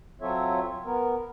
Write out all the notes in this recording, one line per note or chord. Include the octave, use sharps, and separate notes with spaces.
F#3 C4 F4 A4 C#5 E5
B3 A#4